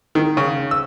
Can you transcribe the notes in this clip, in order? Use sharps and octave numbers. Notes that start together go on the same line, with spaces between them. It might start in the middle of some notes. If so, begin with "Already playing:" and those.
D#3
C#3
E6